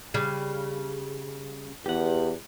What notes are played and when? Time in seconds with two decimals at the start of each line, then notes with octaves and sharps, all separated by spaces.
0.14 C#3 G3
1.86 E2 G4 F#5